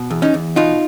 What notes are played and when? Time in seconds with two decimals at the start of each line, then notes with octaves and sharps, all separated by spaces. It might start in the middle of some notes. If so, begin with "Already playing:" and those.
Already playing: B2
0.10 E2
0.22 C#4 D#4
0.34 E2
0.56 B2 D#4 F4